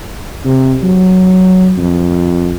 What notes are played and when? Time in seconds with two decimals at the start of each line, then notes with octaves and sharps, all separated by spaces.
0.45 C3
0.83 F#3
1.78 F2